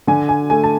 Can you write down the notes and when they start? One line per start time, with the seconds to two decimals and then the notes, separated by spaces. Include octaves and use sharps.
0.07 D3 G#5
0.29 G#5
0.50 A3 G#5
0.64 A5